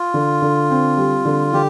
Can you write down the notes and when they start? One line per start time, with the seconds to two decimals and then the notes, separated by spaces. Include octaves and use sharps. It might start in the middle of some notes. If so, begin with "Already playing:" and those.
Already playing: F4
0.14 D3
0.42 D3
0.70 C4
0.97 G3
1.25 D3
1.53 D3 G4